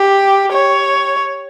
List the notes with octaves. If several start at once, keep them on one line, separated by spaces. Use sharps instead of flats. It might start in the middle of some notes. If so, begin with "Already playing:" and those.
Already playing: G4
C#5